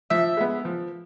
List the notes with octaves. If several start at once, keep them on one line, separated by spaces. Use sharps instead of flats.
F3 E5
G#3 B3
F3